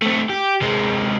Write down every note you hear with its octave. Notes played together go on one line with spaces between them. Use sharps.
A3 C4
G4
C3 G#3